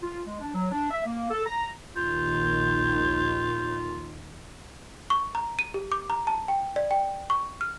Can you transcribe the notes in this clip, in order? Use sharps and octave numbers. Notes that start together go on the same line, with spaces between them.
F4
G#3
D4
F#3
D4
E5
A#3
A4
A#5
A#1 D#2 D#3 F4 G6
C#6
A#5
D#7
G4
D6
A#5
A5
G5
D5
G5
C#6
F6